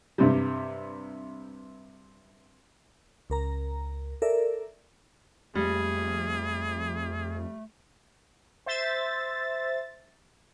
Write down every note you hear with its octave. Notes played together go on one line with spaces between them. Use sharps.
G2 C3 G3
C#2 A#4 A#5
A4 A#4 D5 E5
F2 G3 A3 A#3 G#4
C5 E5 A6